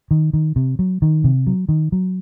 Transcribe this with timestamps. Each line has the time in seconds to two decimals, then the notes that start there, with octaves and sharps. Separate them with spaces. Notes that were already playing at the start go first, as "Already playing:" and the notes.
0.11 D#3
0.33 D#3
0.56 C3
0.79 F#3
1.02 D#3
1.24 C3
1.47 F#3
1.69 D#3
1.92 F#3